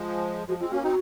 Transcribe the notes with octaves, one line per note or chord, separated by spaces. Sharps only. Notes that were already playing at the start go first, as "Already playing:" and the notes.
Already playing: F3 G#3
F3 G#3 F#4
G#3 C4 F4
A#3 C#4 F#4
C4 D#4 F#4